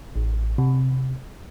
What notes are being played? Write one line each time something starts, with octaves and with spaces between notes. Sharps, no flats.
A1
C3